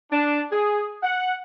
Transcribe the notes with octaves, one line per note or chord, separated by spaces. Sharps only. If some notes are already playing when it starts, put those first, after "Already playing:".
D4
G#4
F#5